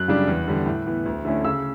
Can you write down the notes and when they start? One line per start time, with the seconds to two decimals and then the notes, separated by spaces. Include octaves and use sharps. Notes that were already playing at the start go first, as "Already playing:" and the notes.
Already playing: F#2 F#6
0.08 C#3 G3 D4
0.28 E2
0.48 D3 G3
0.66 A2
0.87 E3 B3
1.06 D2
1.25 D3 A3 C#4 E4
1.45 C#3 E6